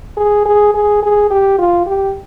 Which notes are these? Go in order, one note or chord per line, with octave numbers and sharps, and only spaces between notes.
G#4
G#4
G#4
G#4
G4
F4
G4